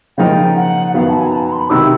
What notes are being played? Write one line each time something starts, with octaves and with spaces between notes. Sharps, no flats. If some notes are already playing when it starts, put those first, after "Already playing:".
C#3 F3 A#3 D#4 G5
F#5
F#2 D#3 F#3 B3 F5
A5
G#5
A#5
A5
A#5
C6
B5
C3 D#3 F#3 E6